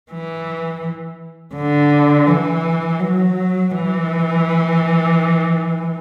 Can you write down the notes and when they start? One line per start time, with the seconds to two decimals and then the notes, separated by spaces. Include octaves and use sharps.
0.12 E3
1.55 D3
2.27 E3
3.00 F#3
3.71 E3